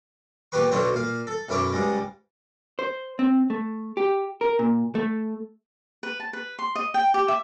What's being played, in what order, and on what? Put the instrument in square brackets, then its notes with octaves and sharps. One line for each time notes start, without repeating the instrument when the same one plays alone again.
[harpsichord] A#2 B3 G4 B4 C#6
B1 B2 D3 F#3 C5 C#5
A#2 F5
A4
B1 F#2 E4 C#5 D6
C#2 G#2 G3 G#3
[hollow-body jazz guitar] C5
C4
A3
G4
A#4
A#2
A3
[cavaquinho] B4
A5
B4
C6
D#5
G5
G4
E5